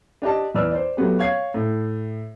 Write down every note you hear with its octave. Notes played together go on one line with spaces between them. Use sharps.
D4 G4 D#5 A5
E2 B4 D5 E6 F6
C5 D5
F#3 A3 B3 G4
C#5 F5 G#6 C7
A2